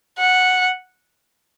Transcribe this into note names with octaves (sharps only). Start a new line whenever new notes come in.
F#5